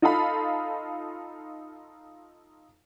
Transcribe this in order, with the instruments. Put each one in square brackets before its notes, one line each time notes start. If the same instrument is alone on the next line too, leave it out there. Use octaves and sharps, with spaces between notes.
[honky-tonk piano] D#4 F4 A4 F5 B5